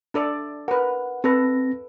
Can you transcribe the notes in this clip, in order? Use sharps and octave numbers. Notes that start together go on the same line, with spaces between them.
D4 A4 D5
A#4 B4 F#5
C4 A4 B4 A#6